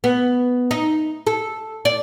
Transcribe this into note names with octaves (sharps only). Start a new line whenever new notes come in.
B3
D#4
A4
D5